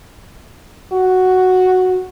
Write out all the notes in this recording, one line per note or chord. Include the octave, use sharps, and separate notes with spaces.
F#4